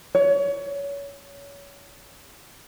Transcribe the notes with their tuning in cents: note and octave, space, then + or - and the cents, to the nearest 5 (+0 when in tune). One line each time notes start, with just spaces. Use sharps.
C#5 +25